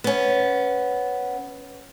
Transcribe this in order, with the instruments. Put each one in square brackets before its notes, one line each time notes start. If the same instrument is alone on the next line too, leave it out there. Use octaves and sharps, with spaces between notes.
[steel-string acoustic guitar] B3 C#4